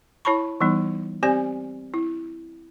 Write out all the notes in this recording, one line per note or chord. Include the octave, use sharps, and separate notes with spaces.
E4 C#5 A5 B5 C#6
E3 G3 B3 D#4
C4 G4 C5 D5 G#5
E4